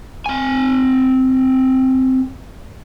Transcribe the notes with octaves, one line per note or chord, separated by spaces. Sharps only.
C4 G#5